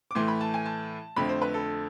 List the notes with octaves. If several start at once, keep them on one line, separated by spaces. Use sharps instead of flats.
D6
A2 E3 A3 C6
B5
A5
G#5
A5
F2 D3 A3 C4 B5
C5
B4
A4